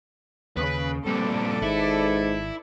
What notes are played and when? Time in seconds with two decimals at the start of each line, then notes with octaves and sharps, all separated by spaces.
0.57 D#2 C#3 B4
1.06 G2 A#2 C4 A4 B4 D5
1.62 G#1 G#2 E4